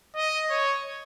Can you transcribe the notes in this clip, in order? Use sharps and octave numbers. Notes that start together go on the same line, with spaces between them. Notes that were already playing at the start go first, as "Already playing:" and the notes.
D#5
C#5